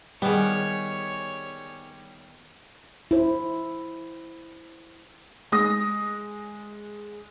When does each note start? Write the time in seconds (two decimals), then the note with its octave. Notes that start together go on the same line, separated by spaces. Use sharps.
0.22 D#3 G3 B3 G#4 C#5
3.11 E4 C5
5.52 G#3 D#6 A#6